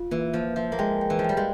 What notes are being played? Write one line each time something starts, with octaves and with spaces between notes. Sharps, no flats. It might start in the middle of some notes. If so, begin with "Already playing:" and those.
Already playing: F4
E3 A#3
F3 A#3
F3 E5
A#3
G#3 G5
G5
E3
F3
G3 G5
G#3